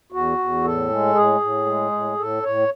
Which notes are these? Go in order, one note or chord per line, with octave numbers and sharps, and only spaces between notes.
E2 F#4
E2
A2 A4
G#3
A2 G#4
A2
G#3
A2
A2 A4
A2 C#5